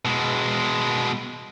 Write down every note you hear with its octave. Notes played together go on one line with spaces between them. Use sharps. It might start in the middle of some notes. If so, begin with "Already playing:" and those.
B2 G#3